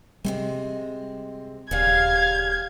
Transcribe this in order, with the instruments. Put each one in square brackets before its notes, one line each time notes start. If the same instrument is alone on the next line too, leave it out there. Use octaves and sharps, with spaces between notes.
[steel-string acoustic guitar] C3 G#3 C4 [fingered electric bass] G3
[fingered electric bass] D#1 [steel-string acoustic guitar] C#3 G3 [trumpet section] F5 [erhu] G#6